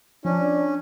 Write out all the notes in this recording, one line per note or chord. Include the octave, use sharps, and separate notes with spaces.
F3 C#4 D4